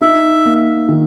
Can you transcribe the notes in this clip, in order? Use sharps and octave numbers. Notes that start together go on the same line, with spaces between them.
D#4 E5
A#3
D#3